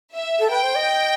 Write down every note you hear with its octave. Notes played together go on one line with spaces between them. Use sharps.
E5
A4
B4 G5
C5
D#5